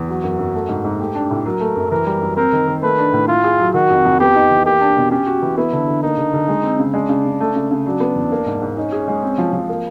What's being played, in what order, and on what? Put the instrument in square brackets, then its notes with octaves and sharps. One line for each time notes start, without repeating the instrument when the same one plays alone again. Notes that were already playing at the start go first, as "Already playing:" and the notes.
Already playing: [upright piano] E2
[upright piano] F#3 [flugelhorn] F#4
[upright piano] F#2
F#2
A3
G#2
G#2
[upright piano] A3 [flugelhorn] G4
[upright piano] D4
A2
[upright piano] F#3 [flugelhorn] A#4
[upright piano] A3
F#2
[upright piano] E3 [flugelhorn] A#4
[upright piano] G3
F#2
[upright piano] C4 [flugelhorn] A#4
[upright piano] D#3
D#3
[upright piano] A3 [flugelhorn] B4
[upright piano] D4
A2
[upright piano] E4 [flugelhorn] F4
[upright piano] G#4
F#3
[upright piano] D#3 [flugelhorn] F#4
[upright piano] F2
F2
[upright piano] B3 [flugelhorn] G4
[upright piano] D#4
E3
[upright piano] A#3 [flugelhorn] G4
[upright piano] D4
B2
[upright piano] C#4 [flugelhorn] G4
[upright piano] F#4
E3
[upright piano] B3 [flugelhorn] E4
[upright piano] D3
D3
[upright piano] A#3 [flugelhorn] D#4
[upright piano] D3
D3
G#3
C4
C#3
[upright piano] G#3 [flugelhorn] D4
[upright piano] C#3
C#3
A3
C#3
C#3
[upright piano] F#3 [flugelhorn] D4
[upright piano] B3
E2
A#3
G#2
G#2
[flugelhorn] C#4 [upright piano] D#4
[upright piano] G#4
G#3
C4
F3
F3
A#3